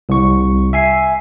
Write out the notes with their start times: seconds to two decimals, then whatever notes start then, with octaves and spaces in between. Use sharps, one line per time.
0.09 C2 C#6
0.73 E5 G#5 C7